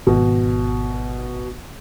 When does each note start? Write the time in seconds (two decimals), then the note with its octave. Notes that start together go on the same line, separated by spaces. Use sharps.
0.07 G#1 B2